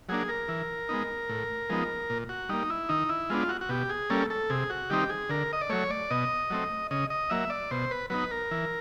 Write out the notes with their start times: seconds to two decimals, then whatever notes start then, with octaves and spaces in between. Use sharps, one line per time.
0.09 F#3 A#3 D4 G#4
0.29 A#4
0.48 E3
0.89 G#3 B3 D#4
1.29 A2
1.70 F3 G#3 B3 D#4
2.10 A#2
2.29 F#4
2.49 G3 A#3 D#4
2.70 E4
2.89 D#3 D#4
3.09 E4
3.30 G#3 B3 D4 F4
3.49 F#4
3.61 F#4
3.69 B2 G4
3.89 G#4
4.10 G3 A#3 C#4 A4
4.30 A4
4.50 C3 G#4
4.70 F#4
4.90 D#3 G3 C4 D#4 G4
5.09 G#4
5.29 D3 A#4
5.53 D#5
5.61 D5
5.70 F#3 A3 C#5
5.90 D5
6.10 B2 D#5
6.50 F#3 A3 C4
6.91 C#3 D#5
7.10 D#5
7.30 F#3 A#3 E5
7.50 D5
7.71 B2 C5
7.91 B4
8.10 F#3 B3 D#4 B4
8.31 A#4
8.51 E3